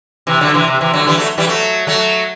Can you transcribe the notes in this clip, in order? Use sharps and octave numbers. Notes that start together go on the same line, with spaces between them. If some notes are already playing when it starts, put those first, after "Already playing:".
C3 E3
D3 F#3
C3 E3
C3
C3 E3
D3 F#3
E3 G3
F#3 A3
E3 G3
F#3 A3
F#3 A3